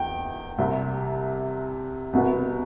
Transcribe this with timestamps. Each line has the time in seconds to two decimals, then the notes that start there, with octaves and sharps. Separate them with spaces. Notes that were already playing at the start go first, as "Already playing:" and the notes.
Already playing: E2 G5
0.58 C2 C3 G3 C4
2.13 C2 B2 B3